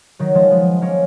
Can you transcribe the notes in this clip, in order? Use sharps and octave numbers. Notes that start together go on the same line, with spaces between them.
D#3 F#3
F3 G#3
G#3 B3
A#3 C#4